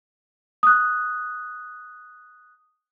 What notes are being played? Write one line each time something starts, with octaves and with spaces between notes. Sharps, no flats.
D#6 F#6